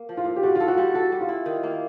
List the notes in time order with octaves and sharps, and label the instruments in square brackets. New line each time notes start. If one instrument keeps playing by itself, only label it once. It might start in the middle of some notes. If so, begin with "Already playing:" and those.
Already playing: [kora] A#3
F3
[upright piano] F4
[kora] A#2
[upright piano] G4
[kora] G3 [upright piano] F#4
[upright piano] F4 [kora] A4
[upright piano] F#4
[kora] G3
[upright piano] F#4 [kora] A4
[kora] G3
[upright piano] F4
[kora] E4
D#3
A#3